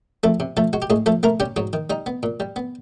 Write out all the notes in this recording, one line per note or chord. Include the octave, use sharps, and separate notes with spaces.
F2 A3 A4
C3
F3 A3 A4
G#3 F#4
G4
A2 G#3 G#4
F3 A3 A4
A3 A#3 A#4
G3 C#4 G4
G#2 F#3 F#4
D#3
G3 D#4
B3
A#2
G3
B3